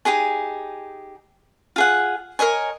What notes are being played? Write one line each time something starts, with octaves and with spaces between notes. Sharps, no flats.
D#4 G4 G#4 G#5
F4 G#4 F#5
A#4 C#5 D#5 G#5